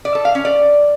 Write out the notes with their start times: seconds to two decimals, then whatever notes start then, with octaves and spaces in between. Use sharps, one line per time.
0.05 D5
0.15 A4
0.25 F5
0.35 C#4
0.45 D5